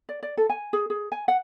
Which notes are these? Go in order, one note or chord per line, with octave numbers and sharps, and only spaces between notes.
D5
D5
A4
G#5
G#4
G#4
G#5
F#5